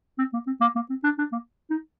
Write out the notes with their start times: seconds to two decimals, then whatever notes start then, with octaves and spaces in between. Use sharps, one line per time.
0.18 C4
0.34 A#3
0.47 C4
0.61 A#3
0.76 A#3
0.90 C4
1.04 D4
1.19 D4
1.33 A#3
1.70 D#4